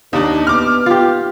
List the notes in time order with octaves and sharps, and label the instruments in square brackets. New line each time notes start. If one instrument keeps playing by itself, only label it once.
[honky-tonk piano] D#2 D4 [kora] D#4 [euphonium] G4
[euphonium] B3 [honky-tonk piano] D6 F6
[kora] F4 G4